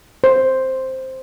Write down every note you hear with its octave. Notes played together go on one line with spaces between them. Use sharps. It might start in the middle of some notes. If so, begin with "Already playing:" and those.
C5